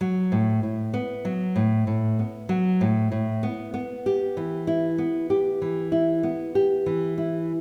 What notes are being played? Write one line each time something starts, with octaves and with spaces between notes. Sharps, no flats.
F#3
A2
A2
B3
F#3
A2
A2
B3
F#3
A2
A2
B3
B3
G4
E3
E4
B3
G4
E3
E4
B3
G4
E3
E4